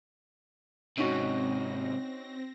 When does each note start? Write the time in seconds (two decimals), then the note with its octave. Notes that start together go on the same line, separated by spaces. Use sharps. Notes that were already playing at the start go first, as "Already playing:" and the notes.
0.98 G#2 C3 C4 C#4 D#4 F#4 A#6